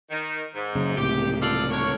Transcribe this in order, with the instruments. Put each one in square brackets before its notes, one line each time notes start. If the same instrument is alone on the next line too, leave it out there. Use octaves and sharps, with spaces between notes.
[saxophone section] D#3
G#2
[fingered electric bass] F#2 C#3
[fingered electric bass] C#2 A2 C3 [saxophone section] G4
[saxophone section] F4 A4 D5
D3 A#4 C#5